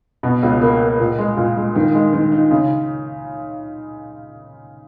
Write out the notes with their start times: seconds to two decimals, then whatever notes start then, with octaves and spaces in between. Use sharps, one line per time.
0.23 B2
0.43 C#2
0.61 A#3
0.80 A#3
1.00 A#2
1.18 G#3
1.37 A#2
1.57 G#3
1.75 D#3
1.94 G#3
2.13 D#3
2.32 D#4
2.51 C#3